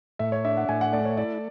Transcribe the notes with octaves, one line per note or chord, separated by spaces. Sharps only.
A2 E5
C#5
D4 E5
F#5
A2 G#5
F#5
A3 D5
C#5
E4 D5